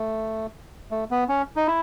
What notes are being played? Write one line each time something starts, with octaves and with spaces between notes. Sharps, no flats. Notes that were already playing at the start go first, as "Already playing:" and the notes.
Already playing: A3
A3
B3
C#4
D#4
E4